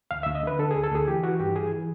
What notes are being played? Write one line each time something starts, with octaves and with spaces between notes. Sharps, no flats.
D2 F5
D2 E5
D#5
D3 B4
D3 A4
D2 G#4
A4
D2 G#4
E3 G4
E3 F#4
G2 G4
E3 G#4
E3